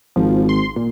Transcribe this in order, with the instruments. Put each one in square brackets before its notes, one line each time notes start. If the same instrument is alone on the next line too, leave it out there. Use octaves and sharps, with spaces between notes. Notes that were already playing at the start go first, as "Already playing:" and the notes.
[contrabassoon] G#1 [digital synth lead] F3
[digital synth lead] C6
A#2